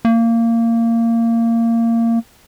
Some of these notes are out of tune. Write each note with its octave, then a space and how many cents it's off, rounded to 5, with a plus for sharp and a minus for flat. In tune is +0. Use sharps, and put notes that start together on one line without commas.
A#3 -20